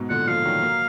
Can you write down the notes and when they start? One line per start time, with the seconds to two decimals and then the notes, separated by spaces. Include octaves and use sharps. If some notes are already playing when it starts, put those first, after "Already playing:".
Already playing: G#2 B2
0.09 A#2 D3 F#5
0.28 D3 F3 F5
0.45 D#3 F#3
0.62 F#3 A#3